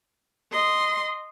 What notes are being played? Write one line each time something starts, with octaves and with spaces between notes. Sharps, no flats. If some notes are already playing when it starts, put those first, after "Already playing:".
D#5 C6